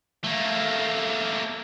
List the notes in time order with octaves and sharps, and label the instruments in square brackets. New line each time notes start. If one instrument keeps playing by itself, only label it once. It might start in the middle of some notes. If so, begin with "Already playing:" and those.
[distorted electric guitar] A3 A#3